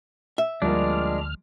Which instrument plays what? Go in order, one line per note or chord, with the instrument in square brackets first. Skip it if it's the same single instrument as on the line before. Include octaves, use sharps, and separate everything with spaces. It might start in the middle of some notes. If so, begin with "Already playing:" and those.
[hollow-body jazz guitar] E5
[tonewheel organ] D2 F6 [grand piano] F3 G3 A#3 [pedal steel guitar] G#3 D4